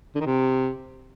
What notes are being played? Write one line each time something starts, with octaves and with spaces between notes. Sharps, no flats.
D3
D#3
C3